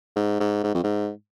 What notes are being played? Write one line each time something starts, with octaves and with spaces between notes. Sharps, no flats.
G#2
G#2
G#2
F2
G#2